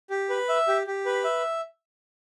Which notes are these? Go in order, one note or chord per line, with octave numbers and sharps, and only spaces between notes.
G4
B4
E5
G4
G4
B4
E5